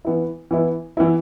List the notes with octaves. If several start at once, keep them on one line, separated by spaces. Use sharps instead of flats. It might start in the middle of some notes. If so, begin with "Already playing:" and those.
E3 B3 E4
E3 B3 E4
E3 B3 E4